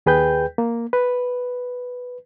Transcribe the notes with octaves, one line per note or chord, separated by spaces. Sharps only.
D#2 G#4 B4 G5 G6
A#3
B4